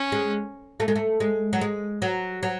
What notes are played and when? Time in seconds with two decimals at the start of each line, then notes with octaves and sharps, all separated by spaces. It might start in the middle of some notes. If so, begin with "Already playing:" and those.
Already playing: C#4
0.12 G#3
0.80 A3
0.88 G#3
0.96 A3
1.20 G#3
1.53 F#3
1.61 G#3
2.02 F#3
2.43 F#3